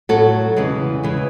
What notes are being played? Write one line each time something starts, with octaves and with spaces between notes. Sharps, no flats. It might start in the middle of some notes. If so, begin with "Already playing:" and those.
A2 F#3 F#4 A4
E2 C#3 E3 G#3
E2 C#3 E3 G#3